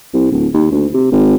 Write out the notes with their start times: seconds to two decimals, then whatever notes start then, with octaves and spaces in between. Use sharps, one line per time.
0.13 C2
0.32 D1
0.54 D#2
0.71 D2
0.94 C3
1.12 G#1